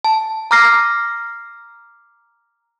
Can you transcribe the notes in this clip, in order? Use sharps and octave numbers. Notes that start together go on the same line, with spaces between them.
A5
A#5 D6 F6 A#6 C7